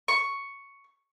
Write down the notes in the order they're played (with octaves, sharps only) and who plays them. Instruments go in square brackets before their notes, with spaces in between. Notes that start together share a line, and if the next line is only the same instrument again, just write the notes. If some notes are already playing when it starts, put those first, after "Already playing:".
[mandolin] C#6